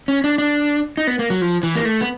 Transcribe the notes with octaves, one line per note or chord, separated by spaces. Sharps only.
C#4
D4
D4
D#4
B3
A#3
F#3
F3
E3
A#3
A3
B3